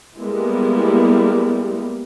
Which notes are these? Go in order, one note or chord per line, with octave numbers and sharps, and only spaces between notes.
G3 G#3 A#3 B3 E4